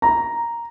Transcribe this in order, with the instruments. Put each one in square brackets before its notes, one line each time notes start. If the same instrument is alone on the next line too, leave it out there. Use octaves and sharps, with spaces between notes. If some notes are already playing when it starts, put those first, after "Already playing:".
[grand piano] A#5